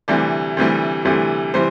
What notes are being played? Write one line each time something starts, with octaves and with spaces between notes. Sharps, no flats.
D2 C3 E3 G3 D5
D2 C3 E3 G3
D2 C3 E3 G3
C3 E3 G3 C5